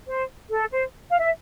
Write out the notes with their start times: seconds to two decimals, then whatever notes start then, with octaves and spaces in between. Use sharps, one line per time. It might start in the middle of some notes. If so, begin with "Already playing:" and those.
0.08 C5
0.49 A4
0.71 C5
1.11 F5
1.19 E5